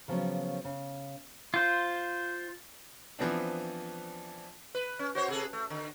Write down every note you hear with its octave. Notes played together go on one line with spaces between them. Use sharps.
C#3 F3 F#3 B3 C#4 C#5
C#3
F4 C5
E3 F3 B3 C4 D4
B4
C#4
F#4 C5 C#5
C3 G#4 A4
A3
D3